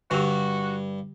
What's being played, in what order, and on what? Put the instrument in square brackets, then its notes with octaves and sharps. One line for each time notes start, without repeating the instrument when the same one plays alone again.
[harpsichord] G2 [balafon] D3 G4 [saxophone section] F#4